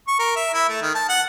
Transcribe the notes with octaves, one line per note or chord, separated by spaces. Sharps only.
C#6
A#4
E5
E4
A3
D#3
A5
F#5